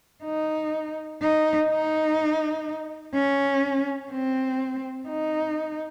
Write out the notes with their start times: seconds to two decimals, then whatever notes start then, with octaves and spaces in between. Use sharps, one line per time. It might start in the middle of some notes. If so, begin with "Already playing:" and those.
0.24 D#4
1.22 D#4
1.70 D#4
3.14 C#4
4.12 C4
5.08 D#4